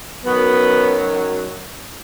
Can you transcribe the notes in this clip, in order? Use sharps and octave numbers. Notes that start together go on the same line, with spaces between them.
F#2 D#3 F#3 B3